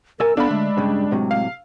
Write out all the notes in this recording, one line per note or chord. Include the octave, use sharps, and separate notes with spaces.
C2 A#4 D5 G#5 E6
B3 D4 A4 D5 F5 B5
D3 G#3 A3
G2 C#3 G3
A2 C3 F#3
F5